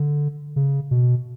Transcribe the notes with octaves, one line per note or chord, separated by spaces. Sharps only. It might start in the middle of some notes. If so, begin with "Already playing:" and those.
Already playing: D3
C#3
B2